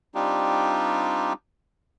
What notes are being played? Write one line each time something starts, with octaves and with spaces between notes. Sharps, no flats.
G3 C4 D4 D#4 F4 G4